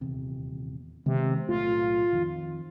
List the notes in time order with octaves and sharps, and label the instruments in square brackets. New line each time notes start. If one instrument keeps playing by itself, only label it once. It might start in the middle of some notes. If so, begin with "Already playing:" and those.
[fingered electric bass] D#1 E2 C3
[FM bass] C3 [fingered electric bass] D#3 G#3 B3
[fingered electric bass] B1 A2 A3 [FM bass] F4
[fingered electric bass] F2 D#3 F3